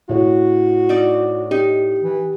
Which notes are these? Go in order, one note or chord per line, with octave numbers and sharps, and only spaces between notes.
A2 F#4 C#5
D#4 D5
D#4 G4
E3